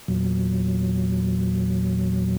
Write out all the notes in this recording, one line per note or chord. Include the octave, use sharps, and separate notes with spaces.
E2 A#2 F#3